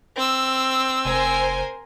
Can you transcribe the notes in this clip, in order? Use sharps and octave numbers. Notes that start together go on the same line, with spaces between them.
C4 E6
F1 A#4 C5 G#5